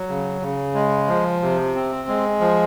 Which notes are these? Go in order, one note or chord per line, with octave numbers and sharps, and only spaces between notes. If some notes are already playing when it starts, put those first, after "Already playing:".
Already playing: F#3
C#3
C#3
G#3
F3
C3
C4
G#3
F3